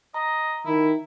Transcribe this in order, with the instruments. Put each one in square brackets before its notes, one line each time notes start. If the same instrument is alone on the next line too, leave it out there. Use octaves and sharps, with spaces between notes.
[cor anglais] D#5 [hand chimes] A#5
[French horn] D#3 [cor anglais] E4